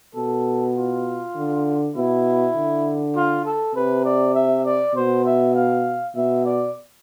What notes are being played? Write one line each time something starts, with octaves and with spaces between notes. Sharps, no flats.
B2 A4
F4
D3
B2 E4
D3
F4
A4
C3 B4
D5
E5
D5
B2 C5
E5
F5
B2 E5
D5